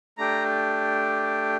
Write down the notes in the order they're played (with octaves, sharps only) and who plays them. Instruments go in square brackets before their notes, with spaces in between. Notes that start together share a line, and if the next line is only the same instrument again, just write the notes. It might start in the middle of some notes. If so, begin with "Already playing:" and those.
[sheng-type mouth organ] A3 D4 G4 A#5